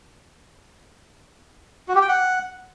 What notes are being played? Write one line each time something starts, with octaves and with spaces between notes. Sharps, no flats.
F#4
G4
G5
F#5